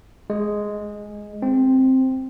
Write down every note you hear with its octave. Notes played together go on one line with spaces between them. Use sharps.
G#3
C4